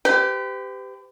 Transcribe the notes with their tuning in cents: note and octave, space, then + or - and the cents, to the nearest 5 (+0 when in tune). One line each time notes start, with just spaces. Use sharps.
G4 +0 B4 +45